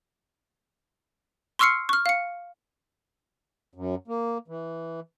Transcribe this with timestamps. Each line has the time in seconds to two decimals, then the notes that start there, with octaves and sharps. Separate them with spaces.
1.59 C6 C#6 E6 F6 C7 C#7
1.89 C#6 F6
2.06 F5 C#7
3.74 F#2
4.08 A#3
4.48 E3